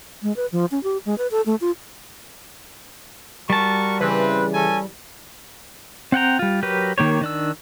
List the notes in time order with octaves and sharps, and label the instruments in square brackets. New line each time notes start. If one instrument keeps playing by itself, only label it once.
[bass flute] G#3
B4
F3
C#4
G4
G#3
B4
A4
A3
F4
[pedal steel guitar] G3 A5 [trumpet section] F#4 A#4 C#6
[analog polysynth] C#3 E3 [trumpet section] C4 B4
[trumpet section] C#4 A4 G#5
[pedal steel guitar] C4 F#5 G5 A#5
G3 F4
F#3 G4 A#4 B4
D#3 A#3 G4 C#5
D#3 D4 E6